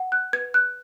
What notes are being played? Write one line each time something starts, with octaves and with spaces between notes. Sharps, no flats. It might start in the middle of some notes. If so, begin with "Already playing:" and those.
Already playing: F#5
F#6
B4 G#6
F#6